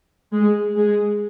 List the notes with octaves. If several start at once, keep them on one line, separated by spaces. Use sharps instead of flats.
G#3
G#3